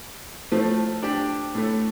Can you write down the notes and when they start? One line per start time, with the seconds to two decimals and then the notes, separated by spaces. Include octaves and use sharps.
0.52 A2 F3 A3
1.02 D4 G4
1.55 A2 A3